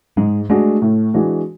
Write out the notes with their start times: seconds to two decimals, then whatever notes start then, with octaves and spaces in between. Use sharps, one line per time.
0.17 G#2 G#3
0.50 G#3 A3 D4 F#4
0.82 A2
1.14 E3 G#3 D4 F#4